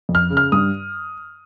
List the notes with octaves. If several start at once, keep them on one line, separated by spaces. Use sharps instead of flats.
F2
F6
C#3
F6
G2 D#6